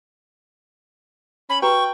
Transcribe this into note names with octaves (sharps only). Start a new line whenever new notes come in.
C#4 B5
F#4 B4 G5 A#5 C#6